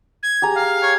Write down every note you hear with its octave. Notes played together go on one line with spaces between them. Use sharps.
G#6
G4 G#4 A#5
F5
C#5